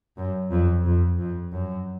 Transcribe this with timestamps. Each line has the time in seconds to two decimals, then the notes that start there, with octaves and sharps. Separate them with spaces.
0.17 F#2
0.51 F2
0.85 F2
1.19 F2
1.52 F#2